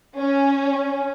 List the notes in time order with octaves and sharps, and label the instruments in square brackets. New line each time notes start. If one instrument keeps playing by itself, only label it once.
[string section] C#4